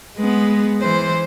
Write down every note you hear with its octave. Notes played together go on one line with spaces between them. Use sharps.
G#3 B3
E3 C5